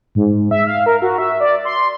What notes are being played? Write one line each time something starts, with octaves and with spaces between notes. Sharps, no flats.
G#2
E5
F5
A#4
F#4
E5
D5
C6